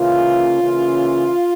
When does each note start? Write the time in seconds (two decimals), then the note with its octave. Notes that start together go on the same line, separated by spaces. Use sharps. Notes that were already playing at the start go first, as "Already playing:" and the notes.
Already playing: C#3 E3 A#3 C#4 F4
0.61 C#3 E3 A#3 C#4